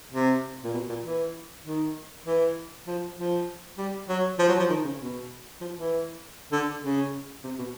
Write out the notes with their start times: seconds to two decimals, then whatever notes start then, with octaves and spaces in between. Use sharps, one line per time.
0.12 C3
0.64 A#2
0.73 B2
0.89 A#2
1.04 E3
1.65 D#3
2.26 E3
2.87 F3
3.17 F3
3.78 G3
4.09 F#3
4.39 F3
4.49 F#3
4.59 F3
4.70 D#3
4.85 C#3
5.00 B2
5.61 F3
5.76 E3
6.52 D3
6.83 C#3
7.44 C3
7.59 B2